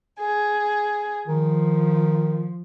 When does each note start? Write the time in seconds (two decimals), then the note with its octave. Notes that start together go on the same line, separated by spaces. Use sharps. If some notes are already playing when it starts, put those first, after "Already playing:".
0.20 G#4
1.28 D#3 F3